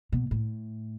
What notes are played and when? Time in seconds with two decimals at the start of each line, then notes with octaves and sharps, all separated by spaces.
0.12 B2
0.31 A2